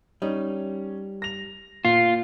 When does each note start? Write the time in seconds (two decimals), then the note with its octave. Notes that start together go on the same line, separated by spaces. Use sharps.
0.22 G3 C#4 D#4
1.22 A#6 F7
1.85 A#2 F4